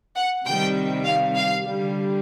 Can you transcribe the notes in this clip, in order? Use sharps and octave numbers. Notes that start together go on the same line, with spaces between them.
F#5
C3 D#3 G3 G5
F5
F5
D3 G3